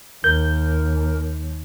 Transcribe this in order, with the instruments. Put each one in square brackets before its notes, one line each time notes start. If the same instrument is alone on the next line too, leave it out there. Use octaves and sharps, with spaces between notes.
[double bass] D#2 [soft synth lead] A#4 [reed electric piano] G6